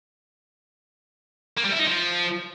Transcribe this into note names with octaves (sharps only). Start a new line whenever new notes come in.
A#3
G3
E4
D#4
F3